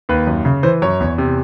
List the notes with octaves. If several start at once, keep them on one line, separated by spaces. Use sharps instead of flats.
D#2 B4
F#2
C#3
E3 C5
F#2 C#5
E2
C3